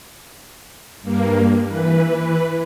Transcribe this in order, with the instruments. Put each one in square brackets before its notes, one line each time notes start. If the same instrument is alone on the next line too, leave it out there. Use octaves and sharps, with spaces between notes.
[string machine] G2 A#3
E3 B4